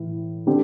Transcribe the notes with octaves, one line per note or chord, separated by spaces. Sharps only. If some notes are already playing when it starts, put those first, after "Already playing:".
Already playing: A2 E3
D3 C4 G4